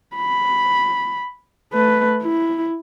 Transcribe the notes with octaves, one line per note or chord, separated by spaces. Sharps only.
B5
A3 B4
E4